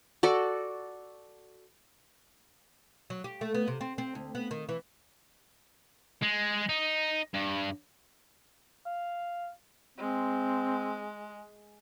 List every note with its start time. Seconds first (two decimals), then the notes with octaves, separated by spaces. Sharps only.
0.23 F#4 A4 D5
3.10 F#3
3.24 G4
3.41 A3
3.54 B3
3.68 C3
3.81 C4
3.98 C4
4.15 D2
4.35 B3
4.51 D#3
4.69 E3
6.22 G#3
6.69 D#4
7.34 G2
8.86 F5
9.98 G#3 C4